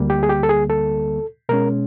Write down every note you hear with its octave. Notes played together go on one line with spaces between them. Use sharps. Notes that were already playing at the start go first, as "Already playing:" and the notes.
Already playing: D2 D3 G3 A#3
G4
G#4
G4
A4
G#4
A4
B2 G#3 C#4 A#4